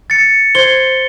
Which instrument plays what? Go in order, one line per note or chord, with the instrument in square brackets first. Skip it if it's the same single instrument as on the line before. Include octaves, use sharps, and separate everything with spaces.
[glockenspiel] A6 C#7
[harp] C5 G#6 [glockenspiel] G7